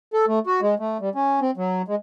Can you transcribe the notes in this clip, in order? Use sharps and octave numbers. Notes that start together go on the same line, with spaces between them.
A4
A3
F#4
G#3
A3
G3
C#4
C4
F#3
G#3